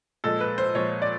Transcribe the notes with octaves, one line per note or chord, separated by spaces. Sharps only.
A#2 F3 G#3 A4
B4
C5
A#2 F3 G#3 C#5
D5